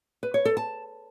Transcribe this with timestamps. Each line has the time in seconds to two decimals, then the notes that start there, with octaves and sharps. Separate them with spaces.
0.23 B4
0.34 C#5
0.45 A4
0.57 A5